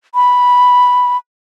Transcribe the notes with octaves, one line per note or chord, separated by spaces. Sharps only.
B5